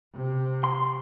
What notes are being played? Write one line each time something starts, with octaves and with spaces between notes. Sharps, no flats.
C3
C6